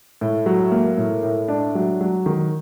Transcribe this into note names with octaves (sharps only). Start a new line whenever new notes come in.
A2
F#3
A#3
A2
A2
D4
F#3
F#3
D#3